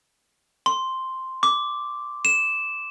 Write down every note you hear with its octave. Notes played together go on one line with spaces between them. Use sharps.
C6
D6
E7